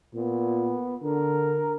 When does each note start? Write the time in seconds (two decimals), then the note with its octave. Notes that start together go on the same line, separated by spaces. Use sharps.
0.14 A#2 B3
1.02 D3 A#4